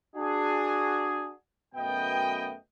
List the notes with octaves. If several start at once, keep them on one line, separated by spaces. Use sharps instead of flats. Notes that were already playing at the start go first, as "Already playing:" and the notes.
D4 F#4 G#4
F#2 B2 A3 B3 D#5 G5